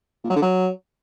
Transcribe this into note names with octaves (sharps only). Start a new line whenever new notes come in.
A#2
F#3
D3
F#3